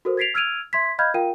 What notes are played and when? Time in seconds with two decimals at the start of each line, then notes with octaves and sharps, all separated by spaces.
0.05 F#4 A4 A#4 C5
0.17 G#6 A6 B6 C7 D7 F7
0.34 E6 F6 G#6 D7 D#7 F7
0.73 E5 C6 G#6 B6
0.99 D#5 F5 B5 F6 G6 G#6
1.14 F4 A#4 F5 G5 D#7